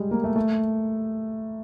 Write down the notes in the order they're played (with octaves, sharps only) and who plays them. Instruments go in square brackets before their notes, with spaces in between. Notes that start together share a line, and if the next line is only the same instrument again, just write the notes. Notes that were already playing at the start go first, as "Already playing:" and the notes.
Already playing: [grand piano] G3 G#3
A#3
A3
A3